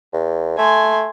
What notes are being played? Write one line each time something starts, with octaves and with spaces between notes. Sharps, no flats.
E2
A3 G#5 C6